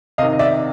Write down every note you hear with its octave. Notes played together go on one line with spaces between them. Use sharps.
C3 D#3 D#5 F5
D#5
D5 E5